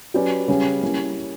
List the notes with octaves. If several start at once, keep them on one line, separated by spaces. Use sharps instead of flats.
F#3 C#4 G4 B4 D5
C#3 G3 C#4
G3 A#3 C#4 E4